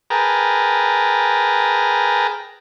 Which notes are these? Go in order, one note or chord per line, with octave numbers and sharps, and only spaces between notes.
G#4 A#4 B4 G5 A5 A#5